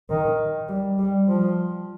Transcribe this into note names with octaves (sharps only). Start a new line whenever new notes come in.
D#3
G3
G3
F3